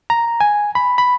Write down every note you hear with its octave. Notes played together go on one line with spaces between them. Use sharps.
A#5
G#5
B5
B5